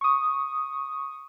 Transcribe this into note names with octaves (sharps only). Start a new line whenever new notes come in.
C#6 D#6